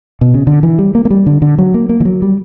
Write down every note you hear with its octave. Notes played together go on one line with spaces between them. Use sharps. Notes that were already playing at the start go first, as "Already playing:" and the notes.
B2
C#3
D3
E3
G3
A#3
A#3
G3
D3
D3
F#3
A#3
A#3
E3
F#3
G3